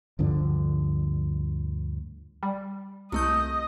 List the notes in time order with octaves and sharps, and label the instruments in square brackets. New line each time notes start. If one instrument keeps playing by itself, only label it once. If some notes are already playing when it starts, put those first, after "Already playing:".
[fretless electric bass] D2 G2 D3 F3
[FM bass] G3
[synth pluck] C2 A3 G6 [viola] D#5